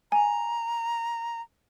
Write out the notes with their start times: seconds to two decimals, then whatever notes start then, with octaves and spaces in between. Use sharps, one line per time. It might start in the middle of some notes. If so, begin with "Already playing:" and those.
0.12 G#5 A#5